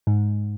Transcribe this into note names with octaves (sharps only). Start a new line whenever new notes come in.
G#2